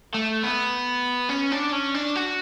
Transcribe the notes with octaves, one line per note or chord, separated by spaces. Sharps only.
A3
B3
C#4
D4
C#4
D4
F#4